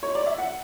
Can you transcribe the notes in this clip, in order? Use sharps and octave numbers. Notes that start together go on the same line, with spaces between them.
C#5
D5
E5
F#5